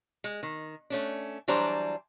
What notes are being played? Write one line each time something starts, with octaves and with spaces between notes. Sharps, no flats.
G#3
D#3
A3 C#4 D4
E3 F#3 G3 D4 C5 A#5